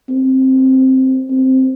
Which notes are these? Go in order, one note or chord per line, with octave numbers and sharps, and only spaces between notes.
C4
C4